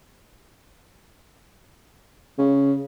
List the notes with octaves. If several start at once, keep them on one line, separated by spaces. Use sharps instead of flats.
C#3